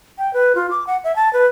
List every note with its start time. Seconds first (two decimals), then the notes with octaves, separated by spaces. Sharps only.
0.18 G5
0.33 B4
0.55 F4
0.71 D6
0.87 F#5
1.04 E5
1.16 A5
1.33 B4